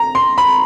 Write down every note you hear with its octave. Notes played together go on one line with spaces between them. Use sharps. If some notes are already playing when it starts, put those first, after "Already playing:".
Already playing: A#5
C6
B5